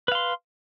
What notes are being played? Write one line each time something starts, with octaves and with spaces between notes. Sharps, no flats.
B4 F5 C6